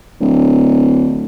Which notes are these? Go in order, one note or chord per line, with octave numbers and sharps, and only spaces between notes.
D1